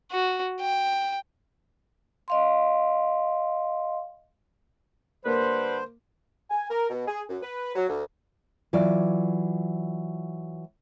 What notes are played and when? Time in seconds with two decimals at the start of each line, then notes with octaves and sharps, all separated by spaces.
0.11 F#4
0.61 G5
2.28 D#5 F5 C6
5.25 D3 G3 A#3 B4 C5
6.50 G#5
6.70 A#4
6.90 B2
7.07 G#4
7.29 F#2
7.42 B4
7.75 F#3
7.89 D2
8.73 E3 F#3 F4 D5